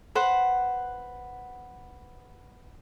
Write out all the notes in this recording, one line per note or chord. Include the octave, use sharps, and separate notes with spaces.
B4 C5 F#5